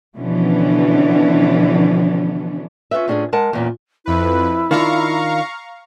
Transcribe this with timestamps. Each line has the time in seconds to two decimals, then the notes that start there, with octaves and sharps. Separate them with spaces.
0.17 B2 D3 E3 F3 C#4 D4
2.91 C#4 F4 G4 B4 E5
3.08 A2 C#4 D4 F4 F#4 G#4
3.33 G#3 A#4 F#5 A5
3.53 E2 A#2 C#4
4.06 F2 E4 B4
4.71 D#3 D4 F4 F5 A#5 C#6